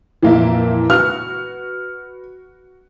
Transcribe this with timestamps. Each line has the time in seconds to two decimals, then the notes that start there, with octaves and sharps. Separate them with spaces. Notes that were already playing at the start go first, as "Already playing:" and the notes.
0.23 F2 A#2 E3 A#3 E5
0.90 F#4 B4 F6